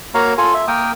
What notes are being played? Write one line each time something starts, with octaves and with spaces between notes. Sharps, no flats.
A#3 F#4 C#5 F5 A#5
F4 A4 G#5
E5
A#3 A#4 G5 D#6